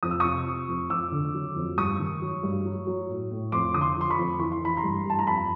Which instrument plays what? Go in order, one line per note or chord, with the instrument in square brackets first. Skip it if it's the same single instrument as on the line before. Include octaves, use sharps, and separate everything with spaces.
[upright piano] F2 D#6
E6
C3 C#6 D#6
F3
F2
F2 D6 E6
D3
F#3
F2
G2 C#6 D#6
D#3
F#3
G2
F#3
F#3
A2
A2
F2 C6 D6
D3 D#6
C6 D6
F3 C6
B5 C#6
F2
E3 C#6
C6
E3 B5
A#5 C6
G2
G2 A5
A#5
F2 A5 B5